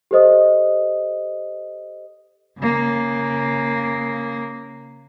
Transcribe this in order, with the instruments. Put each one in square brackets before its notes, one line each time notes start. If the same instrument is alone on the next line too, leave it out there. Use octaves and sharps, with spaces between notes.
[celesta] G4 A4 C5 D#5 D#6
[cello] C#3 A#3